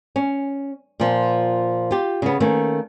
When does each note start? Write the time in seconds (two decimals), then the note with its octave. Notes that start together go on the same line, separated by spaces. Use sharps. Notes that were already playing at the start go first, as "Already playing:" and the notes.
0.16 C#4
1.00 A#2 F3
1.91 F4 G4
2.22 C#3 B3
2.40 D#3 A3 A#3 C#4